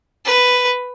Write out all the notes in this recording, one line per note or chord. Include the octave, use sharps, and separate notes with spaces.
B4